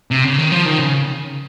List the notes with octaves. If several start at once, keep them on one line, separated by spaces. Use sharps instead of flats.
C3
C#3
D#3
F3
D#3
C#3